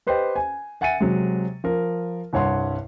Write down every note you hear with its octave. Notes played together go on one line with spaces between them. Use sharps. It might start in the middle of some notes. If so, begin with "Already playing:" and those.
G4 B4 C5 D#5 G5
G#5
E5 F#5 G#5 A6 C#7 D#7
C3 F#3 G#3
F3 A#4
C2 G2 C#5 F#5 C6